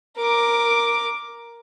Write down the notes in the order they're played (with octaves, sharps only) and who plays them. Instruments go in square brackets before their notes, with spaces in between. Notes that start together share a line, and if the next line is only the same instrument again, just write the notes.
[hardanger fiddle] A#4 D6